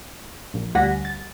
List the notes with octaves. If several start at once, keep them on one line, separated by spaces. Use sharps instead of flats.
A#1
D2 G3 F#5 G#5 A#6 B6
A6